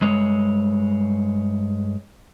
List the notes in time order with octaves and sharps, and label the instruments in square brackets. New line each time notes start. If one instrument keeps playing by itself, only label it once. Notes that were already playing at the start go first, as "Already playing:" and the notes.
[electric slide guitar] G2 G#3 C#5